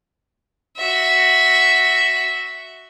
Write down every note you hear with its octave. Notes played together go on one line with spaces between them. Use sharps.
F#4 E5